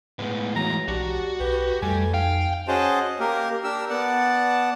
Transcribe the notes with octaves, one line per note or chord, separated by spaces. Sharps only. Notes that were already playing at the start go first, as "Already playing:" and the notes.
A2 G#3 B3
E3 F#3 A#5
B1 D4 F#4 G4
B1 G4 B4
F2 G3 A3 G#5
D#4 F5 G5
C#4 F#4 G#4 C5 D#5 A5
A#3 G4 A#4
D4 G4 A#4 E6
B3 D5 F#5 A5